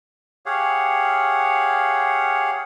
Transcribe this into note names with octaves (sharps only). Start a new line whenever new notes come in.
G4 G#4 C#5 F5 F#5